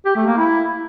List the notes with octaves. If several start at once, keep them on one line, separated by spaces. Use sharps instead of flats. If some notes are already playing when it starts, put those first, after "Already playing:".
G4
A3
A#3
E4